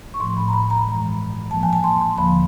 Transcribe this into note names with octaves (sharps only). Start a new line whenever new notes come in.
C#6
A2 F3 A3 C6
B5
A#5
B5
A#5
B5
G2 E3 G#3
A#2 F3 A#3 A5
G#5
A5
C6
C6
D#2 D3 F3 A#3 B5